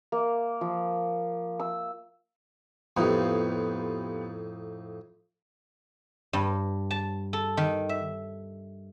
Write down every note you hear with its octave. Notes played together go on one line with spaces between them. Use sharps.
A#3
F3
E6
F2 A2 B3 D#4 F4 G4
G2
A5
A4
D#3
E5